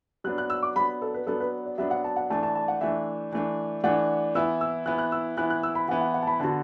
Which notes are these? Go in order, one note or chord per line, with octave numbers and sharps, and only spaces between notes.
F#3 B3 D4 F#6
F#6
E6
D6
F#3 B3 D4 B5
A4
B4
F#3 B3 D4 A4
B4
D5
F#3 B3 D4 E5
F#5
A5
F#5
E3 A3 D4 A5
A5
A5
F#5
E3 A3 D4 E5
E3 A3 D4
E3 A3 D4 F#5
E3 B3 E4 E6
E6
E3 B3 E4 F#6
F#6
E6
E3 B3 E4 F#6
F#6
E6
B5
E3 B3 E4 F#5
F#5
F#5
A5
B5
D3 B3 F#4 A5